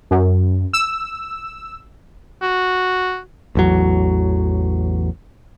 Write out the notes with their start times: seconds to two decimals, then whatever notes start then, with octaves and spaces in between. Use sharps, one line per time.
0.11 F#2
0.73 E6
2.42 F#4
3.55 A1 E2 F#3